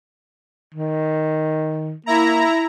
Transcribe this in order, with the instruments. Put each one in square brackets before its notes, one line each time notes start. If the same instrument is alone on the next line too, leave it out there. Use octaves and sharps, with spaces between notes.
[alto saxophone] D#3
[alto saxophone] A#3 [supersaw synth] E4 A#5